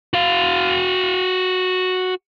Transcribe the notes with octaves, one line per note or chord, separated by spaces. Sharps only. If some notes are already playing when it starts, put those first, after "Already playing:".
F#4 F5